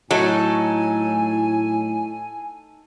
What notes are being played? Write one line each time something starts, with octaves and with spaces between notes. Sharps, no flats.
A2 F#3 D#4 A4 G#5